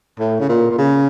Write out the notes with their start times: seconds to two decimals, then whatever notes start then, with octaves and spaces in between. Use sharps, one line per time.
0.19 A2
0.40 C#3
0.49 A#2
0.71 A#2
0.78 C#3